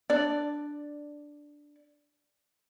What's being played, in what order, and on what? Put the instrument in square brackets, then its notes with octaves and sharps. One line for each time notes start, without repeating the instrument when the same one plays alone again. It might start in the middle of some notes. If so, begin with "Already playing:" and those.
[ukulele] D4 D5